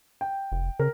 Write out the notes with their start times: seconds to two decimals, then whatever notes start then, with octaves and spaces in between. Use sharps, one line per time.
0.21 G5
0.52 F1
0.79 C#3 A#4